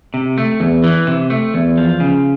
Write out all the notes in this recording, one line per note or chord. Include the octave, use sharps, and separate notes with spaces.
C3
A3
E2
E3
C3
A3
E2
F3
C#3